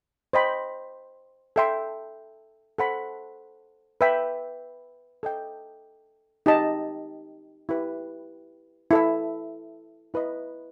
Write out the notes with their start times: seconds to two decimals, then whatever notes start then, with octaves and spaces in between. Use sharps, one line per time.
0.33 C5 D#5 G5 B5
1.56 A4 E5 G5 C6
2.78 A4 C5 F#5 B5
4.01 B4 E5 G5 B5
5.23 A4 D#5 G5
6.46 D#4 G4 D#5 A5
7.69 E4 G4 B4
8.91 E4 A4 E5
10.14 E4 B4 D#5